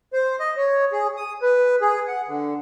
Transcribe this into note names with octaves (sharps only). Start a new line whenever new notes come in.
C5
D#5
C#5
G#4
D#6
B4
G#4
F#5
D3